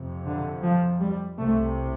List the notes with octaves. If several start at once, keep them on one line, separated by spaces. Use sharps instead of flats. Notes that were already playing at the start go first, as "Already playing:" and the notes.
Already playing: F2 C3
D3
F3
G3
C2 C3 A3